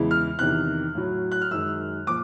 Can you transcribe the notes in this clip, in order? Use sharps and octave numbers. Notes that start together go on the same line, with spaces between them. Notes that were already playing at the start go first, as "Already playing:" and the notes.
Already playing: E2 C#3 E3 G#3
F6
E2 C3 D#3 F#6
A2 F#3
F#6
F6
F#2 D#3 G#3 E6
A#2 F3 D6